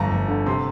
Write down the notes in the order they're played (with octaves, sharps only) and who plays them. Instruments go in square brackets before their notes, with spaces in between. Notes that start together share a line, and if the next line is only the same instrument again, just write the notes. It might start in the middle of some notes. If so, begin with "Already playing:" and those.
Already playing: [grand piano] G1 F2 A5 A#5
G1
D3
C3 C6